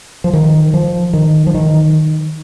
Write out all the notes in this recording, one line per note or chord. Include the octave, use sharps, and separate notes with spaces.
F3
D#3
F3
D#3
F3
D#3